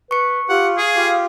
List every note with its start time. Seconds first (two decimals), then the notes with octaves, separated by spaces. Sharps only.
0.11 B4 C#6 C#7
0.49 F4 G4 F#5
0.78 G#4 F5
0.96 F4 G4